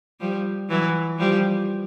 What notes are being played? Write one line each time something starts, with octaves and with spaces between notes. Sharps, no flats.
F3 G3
E3 F#3
F3 G3